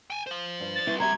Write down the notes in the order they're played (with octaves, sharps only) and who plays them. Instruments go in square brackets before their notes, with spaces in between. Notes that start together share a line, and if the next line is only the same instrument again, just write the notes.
[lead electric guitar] G5 G#5
C5 F5
[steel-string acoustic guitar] G2
[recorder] A6
[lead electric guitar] G3 C4 [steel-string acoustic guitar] E4 B4
[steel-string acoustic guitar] G4 E5 A#5 [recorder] G#6